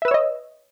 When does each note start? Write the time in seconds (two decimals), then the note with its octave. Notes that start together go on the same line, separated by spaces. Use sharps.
0.02 E5
0.05 B4
0.08 E6
0.11 C#5
0.14 D#5